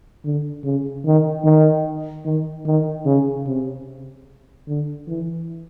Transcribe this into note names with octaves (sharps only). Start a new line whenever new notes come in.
D3
C#3
D#3
D#3
D#3
D#3
C#3
C3
D3
E3